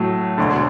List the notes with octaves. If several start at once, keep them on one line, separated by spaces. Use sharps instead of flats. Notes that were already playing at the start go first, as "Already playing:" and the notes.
Already playing: A2 F#3 A3
E1 D2 D3